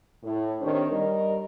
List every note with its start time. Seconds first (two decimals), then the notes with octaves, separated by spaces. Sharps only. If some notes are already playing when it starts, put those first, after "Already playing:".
0.23 A2
0.61 D#3 C4 D4 G4 C5 C#5
0.91 G3 A#4 D#5